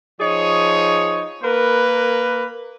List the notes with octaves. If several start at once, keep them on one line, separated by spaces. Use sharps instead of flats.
F3 D#4 G#4 C#5
A#3 A#4 B4